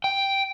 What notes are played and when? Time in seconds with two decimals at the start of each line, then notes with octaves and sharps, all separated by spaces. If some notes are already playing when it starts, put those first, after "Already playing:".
0.04 G5